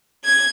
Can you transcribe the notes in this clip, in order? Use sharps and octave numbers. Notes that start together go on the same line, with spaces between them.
G#6